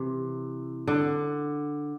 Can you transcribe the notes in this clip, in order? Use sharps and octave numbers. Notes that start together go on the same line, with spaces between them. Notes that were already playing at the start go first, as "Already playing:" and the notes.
Already playing: C3 E3
D3